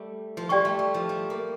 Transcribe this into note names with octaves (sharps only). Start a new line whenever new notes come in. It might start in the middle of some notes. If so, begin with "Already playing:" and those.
Already playing: G3 A3
F3
G3 G4 D5 G5 C#6
A3
G3
F3
G3
A#3